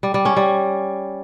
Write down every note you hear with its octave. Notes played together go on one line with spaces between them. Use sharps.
G3
G3
C#4
G3